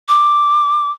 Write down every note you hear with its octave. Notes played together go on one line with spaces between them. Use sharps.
D6